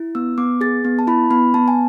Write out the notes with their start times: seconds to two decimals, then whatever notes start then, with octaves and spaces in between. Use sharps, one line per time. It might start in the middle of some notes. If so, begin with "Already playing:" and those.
Already playing: E4
0.15 B3 E6
0.38 B3 D6
0.61 G#4 A6
0.85 B3
0.99 A5
1.07 E4 B5
1.30 B3 B5
1.54 B3 A5
1.68 G#5